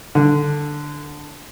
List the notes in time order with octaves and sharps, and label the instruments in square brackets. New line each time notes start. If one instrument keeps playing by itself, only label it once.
[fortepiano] D3